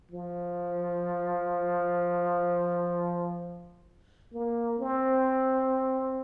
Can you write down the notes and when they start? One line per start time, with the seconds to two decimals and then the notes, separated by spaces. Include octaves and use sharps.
0.12 F3
4.33 A#3
4.79 C4